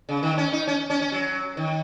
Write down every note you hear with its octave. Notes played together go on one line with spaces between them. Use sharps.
C#3
D#3
C#4
D#4
C#4
C#4
C#4
F#3
D#3